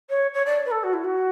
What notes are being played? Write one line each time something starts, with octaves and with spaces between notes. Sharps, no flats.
C#5
C#5
D5
B4
A4
F#4
E4
F#4